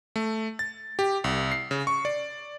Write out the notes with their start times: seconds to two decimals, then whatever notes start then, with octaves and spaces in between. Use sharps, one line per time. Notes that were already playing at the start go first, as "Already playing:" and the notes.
0.16 A3
0.59 A6
0.99 G4
1.24 C2
1.52 C7
1.71 C#3
1.87 C#6
2.05 D5